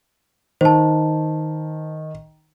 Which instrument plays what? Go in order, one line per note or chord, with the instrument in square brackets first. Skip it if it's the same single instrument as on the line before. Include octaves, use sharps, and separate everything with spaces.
[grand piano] D#3 [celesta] C5 A5